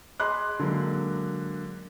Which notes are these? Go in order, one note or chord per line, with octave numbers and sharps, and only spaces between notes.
G#4 D#5 B5 C6 D6 F#6
D3 F#3 G#3 A#3 A#4